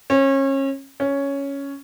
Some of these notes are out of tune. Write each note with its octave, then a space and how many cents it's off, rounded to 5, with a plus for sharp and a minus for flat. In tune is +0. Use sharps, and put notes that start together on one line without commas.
C#4 -30
C#4 +5